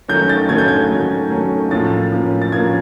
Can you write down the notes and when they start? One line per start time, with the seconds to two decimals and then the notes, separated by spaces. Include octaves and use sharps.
0.08 D#3 F#3 A3 C#4 G6
0.29 A6
0.49 D#3 F#3 A3 C#4 G#6
0.58 G6
0.68 G#6
0.90 D#3 F#3 A3 C#4
1.30 D#3 F#3 A3 C#4
1.71 A2 F3 A#3 C#4 A6
2.12 A2 F3 A#3 C#4
2.42 A6
2.52 A2 F3 A#3 C#4 G#6